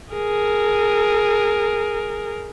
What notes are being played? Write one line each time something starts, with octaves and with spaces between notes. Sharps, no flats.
G#4 A#4